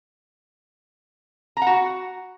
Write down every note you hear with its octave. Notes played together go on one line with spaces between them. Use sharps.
F#4 F#5 A#5